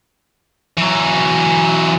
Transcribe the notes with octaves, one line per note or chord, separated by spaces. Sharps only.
E3 F#3